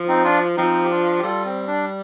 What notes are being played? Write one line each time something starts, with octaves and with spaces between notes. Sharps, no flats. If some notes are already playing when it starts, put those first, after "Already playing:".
Already playing: F3
C4 D#4
D4 F4
F3 C4 D#4
G4
D4 F4
G4
G3 F4 A4
C4
D4